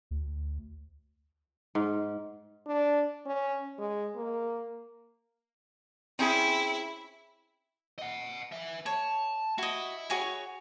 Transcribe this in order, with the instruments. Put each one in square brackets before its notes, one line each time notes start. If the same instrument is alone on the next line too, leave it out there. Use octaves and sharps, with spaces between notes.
[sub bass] D2
[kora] G#2
[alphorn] D4
C#4
G#3
A#3
[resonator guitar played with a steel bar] C4 C#4 G#4 [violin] E4
[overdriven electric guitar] D#5 F#5
B4 E5
[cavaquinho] C#5 [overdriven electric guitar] A5
[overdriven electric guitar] E4 [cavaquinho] F#4 D#5
[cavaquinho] F#4 G#4 C#5